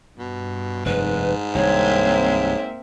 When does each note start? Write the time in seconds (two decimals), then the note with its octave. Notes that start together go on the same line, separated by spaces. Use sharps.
0.18 G2 B2
0.86 F1 G#2 B4
1.55 C2 G2 D#3 A#3 C4 C#5 E5